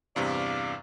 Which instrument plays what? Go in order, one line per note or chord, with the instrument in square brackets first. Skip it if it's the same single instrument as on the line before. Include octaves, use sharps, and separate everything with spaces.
[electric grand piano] E2 G2 C3 [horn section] D5 F5